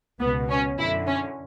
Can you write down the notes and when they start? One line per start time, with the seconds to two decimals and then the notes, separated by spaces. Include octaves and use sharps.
0.20 C#2 B2 B3
0.49 C#4
0.78 F#2 D3 E4
1.07 C#4